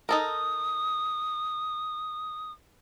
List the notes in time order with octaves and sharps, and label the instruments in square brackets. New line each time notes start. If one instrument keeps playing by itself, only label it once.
[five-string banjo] D#4 A4 A#4 [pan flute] D#6